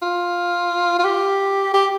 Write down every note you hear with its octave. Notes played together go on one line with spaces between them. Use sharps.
F4
F4
G4
G4